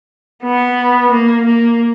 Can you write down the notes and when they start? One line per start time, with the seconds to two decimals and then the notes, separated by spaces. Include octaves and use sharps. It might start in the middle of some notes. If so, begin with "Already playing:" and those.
0.43 B3
1.11 A#3
1.45 A#3